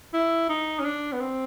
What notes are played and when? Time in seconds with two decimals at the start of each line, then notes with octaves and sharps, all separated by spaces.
0.14 E4
0.49 D#4
0.80 C#4
0.85 D4
1.13 B3
1.20 C4